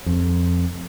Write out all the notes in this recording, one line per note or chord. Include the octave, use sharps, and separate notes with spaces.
F2